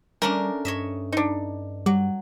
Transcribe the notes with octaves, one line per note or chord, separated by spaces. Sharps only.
G3 A3 C#4 D4 A#4
G2 C#5 D#5 E5
D4 D#4
F#3 G3